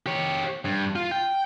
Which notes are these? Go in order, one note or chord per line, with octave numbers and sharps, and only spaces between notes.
G4 C#5
G2
F4
G5